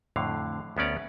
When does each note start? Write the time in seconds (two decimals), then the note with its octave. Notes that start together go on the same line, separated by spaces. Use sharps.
0.16 F2 A2 D3 F5
0.77 D2 B3 C#4 D5 A#5